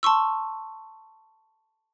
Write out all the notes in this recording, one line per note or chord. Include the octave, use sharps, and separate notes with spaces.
A5 C6 C#6 E6